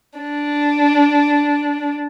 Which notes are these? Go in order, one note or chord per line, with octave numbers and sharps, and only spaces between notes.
D4